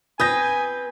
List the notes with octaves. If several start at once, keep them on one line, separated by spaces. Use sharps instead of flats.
C4 B4 G#5 D#6 G6 A#6